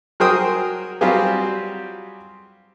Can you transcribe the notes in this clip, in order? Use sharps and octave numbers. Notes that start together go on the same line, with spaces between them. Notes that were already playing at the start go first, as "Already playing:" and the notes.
F#3 G#4 A#4 C5 G5 D#6
F#3 G3 C4 F4 G4 G#4